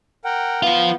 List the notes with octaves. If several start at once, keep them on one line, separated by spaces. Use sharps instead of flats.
A#4 F#5 G5
F3 B3 F4